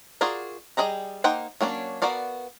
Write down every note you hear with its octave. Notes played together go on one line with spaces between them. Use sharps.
F4 F#4 G#4 A#4 D5
G3 G#4 B4 D#5 A#5
A#3 D#4 C5 F#5 G5
F#3 A#3 C#4 D4
B3 F#4 A#4 D5 F5